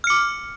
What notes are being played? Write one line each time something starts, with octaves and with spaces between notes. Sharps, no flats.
D6 F6 C#7